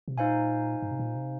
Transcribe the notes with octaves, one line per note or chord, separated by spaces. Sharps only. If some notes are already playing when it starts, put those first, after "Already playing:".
C3
A#2 D#4 C5 F5 G#5
G#2
C3
A#2
C3